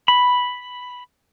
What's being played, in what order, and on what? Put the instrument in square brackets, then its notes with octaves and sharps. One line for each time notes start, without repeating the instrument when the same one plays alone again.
[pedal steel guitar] B5